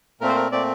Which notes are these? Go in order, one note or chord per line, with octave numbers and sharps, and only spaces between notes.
A#2 A3 C4 A#4
C5
A#4
A#2 A3 C4 D5